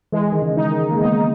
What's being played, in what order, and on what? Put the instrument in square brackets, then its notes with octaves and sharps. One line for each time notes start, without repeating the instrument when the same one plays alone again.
[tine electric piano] E3 [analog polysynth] G#3
[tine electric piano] D#3
C#3
[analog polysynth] D#4
[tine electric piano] D#3
A#3
[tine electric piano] B3 [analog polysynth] D#4